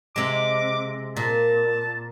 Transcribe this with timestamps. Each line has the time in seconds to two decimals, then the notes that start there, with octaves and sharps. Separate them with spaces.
0.16 C3 G#3 D6
1.16 A#2 A5